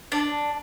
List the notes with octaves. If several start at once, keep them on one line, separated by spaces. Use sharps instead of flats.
D4